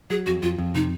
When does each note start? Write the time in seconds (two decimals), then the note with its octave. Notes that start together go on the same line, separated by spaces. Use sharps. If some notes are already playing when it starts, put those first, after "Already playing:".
0.10 F#3 G#4
0.26 F2 F#4
0.43 F2 F4
0.58 F2
0.75 C3 D#4